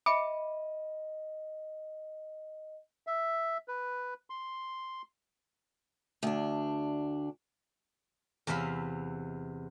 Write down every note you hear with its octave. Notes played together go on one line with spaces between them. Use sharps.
D#5 E5 B5 D6 C#7
E5
B4
C6
D2 D4
E2 C3 E5 F5 B5